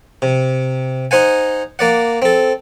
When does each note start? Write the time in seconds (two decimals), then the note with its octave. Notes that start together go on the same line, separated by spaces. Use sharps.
0.22 C3
1.11 D#4 C5 F#5 G#5
1.79 A#3 D5 F#5
2.22 C4 A4